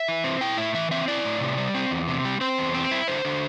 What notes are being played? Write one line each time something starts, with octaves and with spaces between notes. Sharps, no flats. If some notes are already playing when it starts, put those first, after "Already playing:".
Already playing: E5
E3
C4
E4 G5
A2 E5
E3 E5
C4 E5
E4 D5
A2
C3
G3
C4
E2
C3
G3
C4 C5
E2
C4
E4
D3 C5
D3